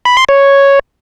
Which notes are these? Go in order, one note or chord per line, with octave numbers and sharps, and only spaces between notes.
B5
C6
C#5